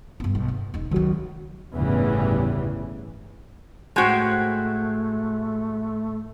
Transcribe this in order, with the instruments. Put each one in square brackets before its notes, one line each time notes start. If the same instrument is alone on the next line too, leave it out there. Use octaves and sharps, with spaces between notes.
[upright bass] G2 B3
B1
E2
E1 D#4
[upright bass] C#2 D3 [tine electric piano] D#3 F#3 F#4
[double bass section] G1 E2 A2 C#3 E3 G3
[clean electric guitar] A2 C5 G5 [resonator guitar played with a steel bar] G#3 F#4 [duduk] A3